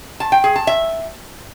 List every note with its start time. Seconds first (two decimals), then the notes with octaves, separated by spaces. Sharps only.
0.20 A5
0.32 G5
0.44 G#4
0.56 A5
0.67 E5